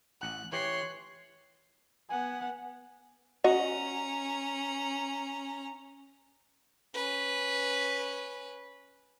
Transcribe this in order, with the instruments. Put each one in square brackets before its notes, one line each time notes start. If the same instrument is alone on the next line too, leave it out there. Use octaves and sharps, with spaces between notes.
[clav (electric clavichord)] A1 F#5 [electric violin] F#6
[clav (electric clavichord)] E3 G4 [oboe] C#5 [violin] C6 [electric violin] F#6
[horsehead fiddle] B3 F#5 [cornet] G#5
[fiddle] C#4 A#5 [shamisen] F#4 D#5
[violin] C#4 B4